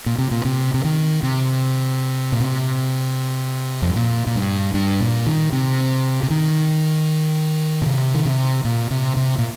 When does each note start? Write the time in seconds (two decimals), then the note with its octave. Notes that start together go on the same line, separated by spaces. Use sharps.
0.06 A#2
0.18 C3
0.31 A#2
0.45 C3
0.74 C3
0.84 D#3
1.23 C3
2.32 A#2
2.40 C3
3.82 F2
3.89 G2
3.96 A#2
4.27 A#2
4.35 G2
4.74 G2
5.00 A#2
5.26 D#3
5.52 C3
6.23 C3
6.30 D#3
7.82 A#2
7.86 C3
8.14 D#3
8.25 C3
8.65 A#2
8.91 C3
9.17 C3
9.38 A#2